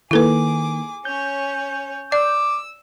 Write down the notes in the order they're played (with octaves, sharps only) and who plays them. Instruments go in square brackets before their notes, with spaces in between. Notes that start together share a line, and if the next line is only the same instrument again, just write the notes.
[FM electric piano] D#3 A#3 [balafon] E4 A4 B4 [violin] G#4 D6
[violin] C#4 C#5 [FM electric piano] G6
[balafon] D5 [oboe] D6 [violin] E6